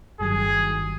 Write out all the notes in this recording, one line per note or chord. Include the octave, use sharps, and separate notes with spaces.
G1 G2 D#3 F#3 G#4